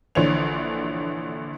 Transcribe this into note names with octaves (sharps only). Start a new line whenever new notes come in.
A#1 D3 E3 C#5 F7